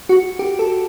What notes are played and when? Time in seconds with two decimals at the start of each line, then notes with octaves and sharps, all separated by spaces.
0.09 F#4
0.39 G4
0.59 A4